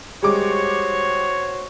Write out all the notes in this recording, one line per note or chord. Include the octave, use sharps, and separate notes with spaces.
G3 G#3 F#4 C5 C#5 D6